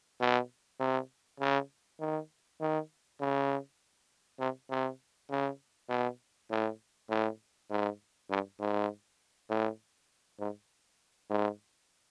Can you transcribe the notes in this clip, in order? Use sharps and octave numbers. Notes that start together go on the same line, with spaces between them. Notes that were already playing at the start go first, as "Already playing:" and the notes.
B2
C3
C#3
D#3
D#3
C#3
C3
C3
C#3
B2
A2
A2
G#2
G2
G#2
A2
G#2
G#2